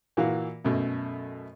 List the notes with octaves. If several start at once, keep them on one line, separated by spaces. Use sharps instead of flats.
A#2 E3 F#4 F5
F#2 B2 A3